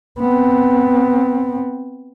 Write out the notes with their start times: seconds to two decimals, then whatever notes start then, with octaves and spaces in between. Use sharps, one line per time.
0.20 B3 C4